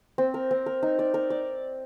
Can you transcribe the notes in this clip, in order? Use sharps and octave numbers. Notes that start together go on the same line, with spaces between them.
C4
A#4
C4
A#4
D#4
D5
A#4
D5